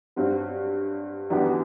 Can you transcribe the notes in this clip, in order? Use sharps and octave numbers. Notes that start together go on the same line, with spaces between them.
G2 F#3 C4
F#2 E3 B3 D4 G4